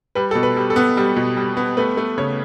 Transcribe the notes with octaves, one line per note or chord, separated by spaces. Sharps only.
G3 B4
B2 A4
B4
G3
A4
B3
G3
B2
G3
B3
A3 B4
A3
C#3 C#5